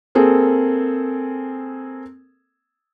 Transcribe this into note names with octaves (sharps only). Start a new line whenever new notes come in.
A#3 C4 G#4 A4